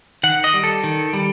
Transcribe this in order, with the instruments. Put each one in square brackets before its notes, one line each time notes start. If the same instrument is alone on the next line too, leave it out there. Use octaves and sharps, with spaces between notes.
[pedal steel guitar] D#3 F#5
D#5
G3
A4
D#3
G3